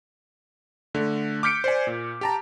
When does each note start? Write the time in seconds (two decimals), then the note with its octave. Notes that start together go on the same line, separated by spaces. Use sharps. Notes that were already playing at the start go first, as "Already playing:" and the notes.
0.95 D3 A3
1.43 D6 F6 G6 B6 C#7 D7
1.64 C5 D5 G#5
1.87 A#2
2.21 G4 A5 A#5